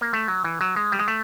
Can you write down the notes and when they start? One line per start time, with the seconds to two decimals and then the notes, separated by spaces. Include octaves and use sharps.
0.01 A#3
0.13 A3
0.28 F#3
0.44 E3
0.61 F#3
0.76 G#3
0.92 G3
0.99 G#3
1.08 A3